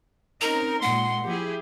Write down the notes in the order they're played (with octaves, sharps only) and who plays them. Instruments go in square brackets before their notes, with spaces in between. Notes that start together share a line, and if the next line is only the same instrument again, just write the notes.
[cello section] C4 C#4 D#4 [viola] A#4 [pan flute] A#5
[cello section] A#2 G#3 [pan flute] F#5 [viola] C6
[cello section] F3 E4 G#4 [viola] G4